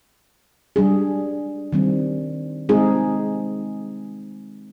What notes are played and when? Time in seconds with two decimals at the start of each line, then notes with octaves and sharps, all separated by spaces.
0.76 G3 D4 G#4
1.73 D#3 G3 C4
2.69 G#3 C4 D#4 G#4